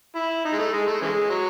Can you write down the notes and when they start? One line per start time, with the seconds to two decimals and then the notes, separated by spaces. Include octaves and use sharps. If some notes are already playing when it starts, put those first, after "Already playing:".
0.16 E4
0.45 D#4
0.53 G#3
0.58 A3
0.73 G#3
0.87 A3
1.01 C#3 E3 G#3
1.30 F#3